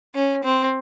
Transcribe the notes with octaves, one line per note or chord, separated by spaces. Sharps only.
C#4
C4